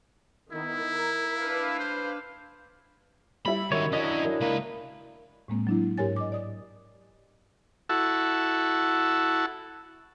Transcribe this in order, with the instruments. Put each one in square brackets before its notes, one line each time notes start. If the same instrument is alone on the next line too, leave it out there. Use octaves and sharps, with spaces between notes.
[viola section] D#3 B3 [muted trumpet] E4
[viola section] A#4
D4 B4 F5
[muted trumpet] C5
[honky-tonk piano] G3 E4 [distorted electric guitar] B5
[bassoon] F#2 [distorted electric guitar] D#3 G#3 [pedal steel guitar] C#5
[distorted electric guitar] F#3 C#4 [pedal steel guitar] D4 E4 [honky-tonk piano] D#5
[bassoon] F#2
[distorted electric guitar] C#2 B4 [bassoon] A#3
[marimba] A2 G#3 A#3 C4
F#3 D4 E4
G#2 G4 A#4 C#5 G#5 A6
D#5 D6
D5 D#6
[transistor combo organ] E4 F#4 A4